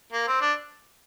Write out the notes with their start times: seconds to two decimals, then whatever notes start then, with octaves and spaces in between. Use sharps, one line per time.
0.13 A#3
0.28 C4
0.41 D4